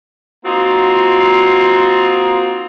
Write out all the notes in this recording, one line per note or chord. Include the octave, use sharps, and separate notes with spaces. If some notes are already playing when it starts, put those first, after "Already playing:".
A#3 C4 D#4 F4 F#4